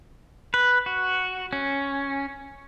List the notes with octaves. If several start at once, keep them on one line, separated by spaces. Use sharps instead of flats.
B4
F#4
C#4